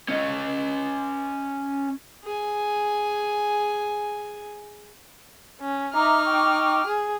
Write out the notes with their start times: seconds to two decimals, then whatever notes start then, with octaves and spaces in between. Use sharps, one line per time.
0.09 C#4 D#5
2.24 G#4 G#5
5.60 C#4
5.94 D#4 E5 A#5 D6 F6
6.25 G5 C#6 D6
6.86 G#4